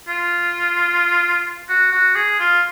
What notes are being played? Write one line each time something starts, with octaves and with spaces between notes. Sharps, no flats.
F4
F#4
F#4
G#4
F4